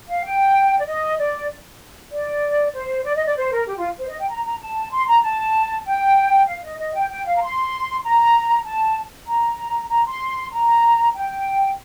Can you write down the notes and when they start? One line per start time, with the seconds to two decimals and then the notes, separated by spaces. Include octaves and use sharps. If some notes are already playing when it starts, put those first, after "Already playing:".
0.09 F5
0.25 G5
0.78 D5
0.86 D#5
1.18 D5
2.11 D5
2.74 C5
3.05 D5
3.15 D#5
3.26 D5
3.36 C5
3.52 A#4
3.67 G4
3.78 F4
3.98 C5
4.08 D#5
4.19 G5
4.29 A#5
4.45 A#5
4.61 A5
4.92 C6
5.08 A#5
5.23 A5
5.85 G5
6.47 F5
6.63 D#5
6.79 D#5
6.94 G5
7.10 G5
7.25 F5
7.34 A#5
7.41 C6
8.04 A#5
8.66 A5
9.28 A#5
9.90 A#5
10.06 C6
10.52 A#5
11.15 G5